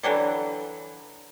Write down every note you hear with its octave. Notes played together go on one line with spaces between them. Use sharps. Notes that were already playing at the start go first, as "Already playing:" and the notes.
D3 E3 F#3 G3